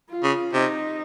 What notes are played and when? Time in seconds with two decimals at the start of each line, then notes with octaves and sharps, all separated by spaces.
0.09 F4
0.23 C#3
0.53 C3 D#4